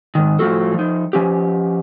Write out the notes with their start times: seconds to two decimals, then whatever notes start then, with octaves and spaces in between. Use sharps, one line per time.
0.15 G#2 D#3
0.39 A2 F3 B3 F4 F#4 A4
0.74 F3 D#4
1.13 F3 C#4 G4